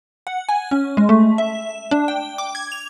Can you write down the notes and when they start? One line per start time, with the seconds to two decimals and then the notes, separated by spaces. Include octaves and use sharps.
0.27 F#5
0.49 G#5
0.71 C#4
0.97 G#3
1.09 A3
1.38 E5
1.91 D4
2.08 G5
2.38 D6
2.55 G#6
2.72 F7